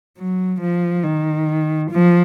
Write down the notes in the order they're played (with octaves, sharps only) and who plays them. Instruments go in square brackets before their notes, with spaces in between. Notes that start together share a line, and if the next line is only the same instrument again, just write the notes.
[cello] F#3
F3
D#3
F3